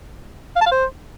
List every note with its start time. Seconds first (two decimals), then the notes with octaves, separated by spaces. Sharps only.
0.56 F5
0.61 A5
0.67 F5
0.72 C5